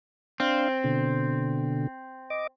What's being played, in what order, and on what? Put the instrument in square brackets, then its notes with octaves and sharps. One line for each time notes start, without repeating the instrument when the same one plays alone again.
[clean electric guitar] C4 [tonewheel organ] D4 F5
[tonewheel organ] B2 D3
D#5 D6